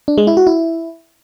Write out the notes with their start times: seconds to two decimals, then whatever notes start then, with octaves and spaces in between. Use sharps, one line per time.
0.08 D4
0.18 G#3
0.27 E4
0.37 F#4
0.47 E4